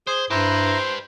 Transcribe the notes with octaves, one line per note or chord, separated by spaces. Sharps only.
G#4 C5
G2 E4 G4 B4 C5 A#5